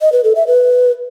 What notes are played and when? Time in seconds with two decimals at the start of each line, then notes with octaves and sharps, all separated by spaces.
0.01 D#5
0.12 B4
0.24 A4
0.36 E5
0.47 B4